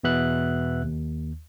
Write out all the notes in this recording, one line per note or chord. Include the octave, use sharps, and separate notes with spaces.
E2 B2 B3 E5 F#6
D#2